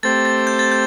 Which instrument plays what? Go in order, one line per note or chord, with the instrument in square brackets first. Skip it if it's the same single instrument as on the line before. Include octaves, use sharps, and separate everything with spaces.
[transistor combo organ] A3 C4 G4 C5 [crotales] A6
[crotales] A6
G6
A6
G6